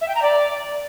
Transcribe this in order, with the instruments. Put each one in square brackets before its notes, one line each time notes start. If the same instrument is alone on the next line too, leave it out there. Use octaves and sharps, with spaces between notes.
[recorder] E5
G5
A#5
D5